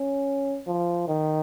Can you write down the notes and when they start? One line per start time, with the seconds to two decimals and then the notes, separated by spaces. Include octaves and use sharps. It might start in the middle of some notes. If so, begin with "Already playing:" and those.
Already playing: C#4
0.67 F3
1.08 D#3